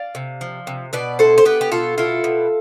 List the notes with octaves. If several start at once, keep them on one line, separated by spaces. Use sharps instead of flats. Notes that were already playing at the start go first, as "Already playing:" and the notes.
Already playing: D5 F5
C3
F3
C3
B2 B4 D5
E4 A4 C5
C5
B3 G4 B4
G4
B2 F4 A4
E4 F4 A4
B2